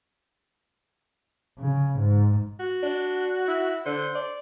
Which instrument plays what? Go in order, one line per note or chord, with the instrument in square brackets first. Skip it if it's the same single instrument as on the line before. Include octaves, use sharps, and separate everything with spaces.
[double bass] C#3
G#2
[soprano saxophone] F#4
[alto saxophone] D4
E4
[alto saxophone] D3 [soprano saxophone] C5
[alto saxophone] D5